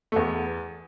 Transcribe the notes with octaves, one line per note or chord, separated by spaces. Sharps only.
A3
E2 B3